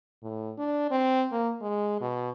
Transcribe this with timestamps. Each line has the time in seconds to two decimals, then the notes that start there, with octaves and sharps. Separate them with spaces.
0.22 A2
0.58 D4
0.91 C4
1.32 A#3
1.61 G#3
2.01 B2